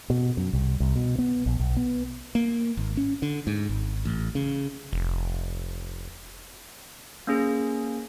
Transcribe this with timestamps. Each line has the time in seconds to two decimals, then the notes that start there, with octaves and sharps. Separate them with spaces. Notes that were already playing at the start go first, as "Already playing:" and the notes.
0.10 B2
0.37 F#2
0.53 C2
0.80 C2
0.96 B2
1.18 B3
1.46 A#1
1.60 B1
1.77 B3
2.35 A#3
2.77 G#1
2.97 C#4
3.22 D3
3.47 G#2
3.69 G#1
4.05 A1
4.35 C#3
4.93 F1
7.27 A#3 C#4 G#4